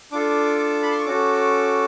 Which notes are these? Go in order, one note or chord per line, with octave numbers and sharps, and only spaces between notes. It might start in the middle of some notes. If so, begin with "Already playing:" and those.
D4 F4 A4 D6
D6
B5
C6
C#6
C#4 F#4 A4 D6